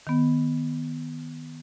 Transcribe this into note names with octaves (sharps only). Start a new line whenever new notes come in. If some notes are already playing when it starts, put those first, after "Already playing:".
D#3 B3